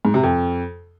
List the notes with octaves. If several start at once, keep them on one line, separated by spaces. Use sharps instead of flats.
G#2
C3
F2